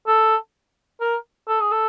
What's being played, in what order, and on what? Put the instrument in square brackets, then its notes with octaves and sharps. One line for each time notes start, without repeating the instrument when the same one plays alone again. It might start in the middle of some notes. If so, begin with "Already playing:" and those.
[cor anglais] A4
A#4
A4
G#4
A4